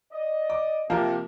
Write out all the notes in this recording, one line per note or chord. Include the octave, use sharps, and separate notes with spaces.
D5 D#5
D6
C3 F3 A#3 A#4